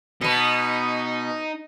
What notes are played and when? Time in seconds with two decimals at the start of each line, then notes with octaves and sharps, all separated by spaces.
0.21 B2 B3 D#4